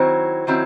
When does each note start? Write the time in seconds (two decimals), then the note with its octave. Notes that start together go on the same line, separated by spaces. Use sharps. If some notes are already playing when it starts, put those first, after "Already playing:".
Already playing: D#3 F#3 C4 E4 C5
0.47 D#3 F#3 C4 E4